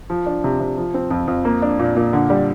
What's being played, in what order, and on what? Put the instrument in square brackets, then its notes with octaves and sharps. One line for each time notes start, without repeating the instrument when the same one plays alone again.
[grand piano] F3
D4
C3
C3
F3
C4
F2
F2
A#3
D4
A#2
A#2
D3
G3